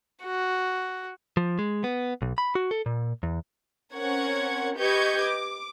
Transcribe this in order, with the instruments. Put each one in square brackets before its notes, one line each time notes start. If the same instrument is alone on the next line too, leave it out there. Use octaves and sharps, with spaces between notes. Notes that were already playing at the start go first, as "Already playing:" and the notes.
[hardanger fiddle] F#4
[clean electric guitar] F3
G#3
B3
B1
B5
F#4
A4
A#2
E2
[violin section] C4 C#4 A#4 F#5 C#6 G#6
G4 B4 D#5 C#6 G6 G#6
D6